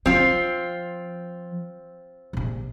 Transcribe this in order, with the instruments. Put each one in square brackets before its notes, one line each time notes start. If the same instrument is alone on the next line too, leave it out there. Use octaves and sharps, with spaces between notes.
[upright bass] F3 [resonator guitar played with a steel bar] C4 F4
[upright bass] A#1 C3